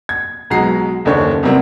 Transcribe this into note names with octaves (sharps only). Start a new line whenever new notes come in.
G#6
B1 B2 F#3 G#3 A#5 C7
F#1 D#2 D3 C#4 A4 C#5
E2 C3 G3 A#3 C4